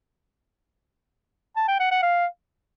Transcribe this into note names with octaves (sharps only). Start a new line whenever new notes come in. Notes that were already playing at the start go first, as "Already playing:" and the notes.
A5
G5
F#5
F#5
F5